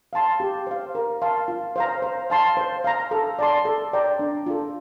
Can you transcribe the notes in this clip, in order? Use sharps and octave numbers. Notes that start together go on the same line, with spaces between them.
F5 A5 C6
G4
C5 F5
A#4
F5 A5 C6
F4
C5 F5 A#5
C5
F5 A5 C6
C5
F5 A#5
A4
D5 A5 C6
A4
D5 G5 A#5
D4
F4 A4